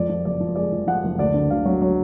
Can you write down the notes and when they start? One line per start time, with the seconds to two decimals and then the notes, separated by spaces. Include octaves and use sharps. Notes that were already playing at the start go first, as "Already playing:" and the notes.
Already playing: F2 D5
0.10 F3
0.25 F#1 D5
0.41 F3
0.56 G#3 D5
0.72 F3
0.87 F3 F#5
1.04 F#1
1.18 D2 D5
1.34 D3
1.50 D2 F5
1.65 F#3
1.82 F#3